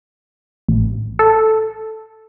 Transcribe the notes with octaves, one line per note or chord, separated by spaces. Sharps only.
A1
A4